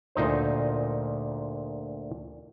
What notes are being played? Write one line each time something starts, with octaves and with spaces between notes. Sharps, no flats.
D2 A#2 D#4 C5